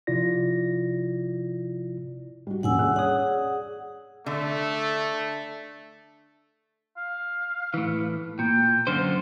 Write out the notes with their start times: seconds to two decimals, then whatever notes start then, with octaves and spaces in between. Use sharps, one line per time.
0.07 C3 F3 E4 F4 D5 A#6
2.47 G3 F#4
2.63 D#1 A#1 C#4 F#5 G#5 E6
2.78 C#4 G#4 F#6
2.96 G#4 C#5 D5 F#5 D#6
4.26 D3 A3
6.97 F5
7.74 A2 E3
8.39 A#2 G5
8.87 F#2 D3 F4 C5